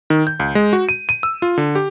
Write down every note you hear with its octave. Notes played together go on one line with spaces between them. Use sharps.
D#3
G6
C#2
G#3
F#4
D#7
D#7
E6
F4
D3
G4